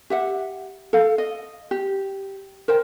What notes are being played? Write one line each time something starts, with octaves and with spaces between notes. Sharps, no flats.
G4 E5 F#5
A4 F5
D#5
G4
A#4 C5 G5